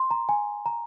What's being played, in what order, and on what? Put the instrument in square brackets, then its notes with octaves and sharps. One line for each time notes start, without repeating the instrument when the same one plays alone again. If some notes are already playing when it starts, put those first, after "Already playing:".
Already playing: [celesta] C6
A#5
G#5
A#5